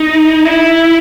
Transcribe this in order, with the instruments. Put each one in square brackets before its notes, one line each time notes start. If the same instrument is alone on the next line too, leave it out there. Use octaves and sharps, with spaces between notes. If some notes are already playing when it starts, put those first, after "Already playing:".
Already playing: [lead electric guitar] D#4
E4